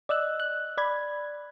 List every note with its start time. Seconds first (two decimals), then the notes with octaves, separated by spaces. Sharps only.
0.09 D5 D#5 E6 F#6
0.40 F#6
0.78 D5 B5 G#6